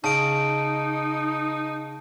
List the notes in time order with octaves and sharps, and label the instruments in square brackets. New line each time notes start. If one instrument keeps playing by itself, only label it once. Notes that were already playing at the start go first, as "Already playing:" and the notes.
[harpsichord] C#3 [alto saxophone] D#4 [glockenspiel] A5 D7